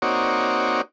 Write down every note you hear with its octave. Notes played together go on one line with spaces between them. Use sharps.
A#3 C4 D#4 F#4 C#5 D5